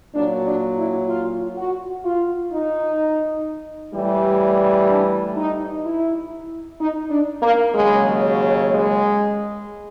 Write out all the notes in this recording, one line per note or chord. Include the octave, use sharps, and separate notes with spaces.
A#2 F#3 D4
D4
E4
F4
F#4
F4
D#4
A2 E3 G3
D4
D#4
E4
D#4
D4
A#3
D#2 C#3 F#3 G#3
G#3